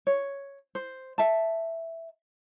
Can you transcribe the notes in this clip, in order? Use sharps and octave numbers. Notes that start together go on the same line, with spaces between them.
C#5
C5
E5 A5